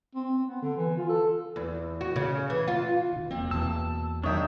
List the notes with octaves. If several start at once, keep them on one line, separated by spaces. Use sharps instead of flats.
C4
C4
B3
D3
E3
F4
A4
E2
F#4
C#3
E3
F4
B2 D#3
E1 A#3 C4
E2 B2 A#3 A5 E6
F#2 D#3 D4 C#5 D#5 E5 G5